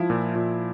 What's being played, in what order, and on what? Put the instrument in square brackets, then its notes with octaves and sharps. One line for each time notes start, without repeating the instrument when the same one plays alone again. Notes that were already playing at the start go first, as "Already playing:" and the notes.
Already playing: [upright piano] F3 [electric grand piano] E4
[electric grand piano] A#2
A#2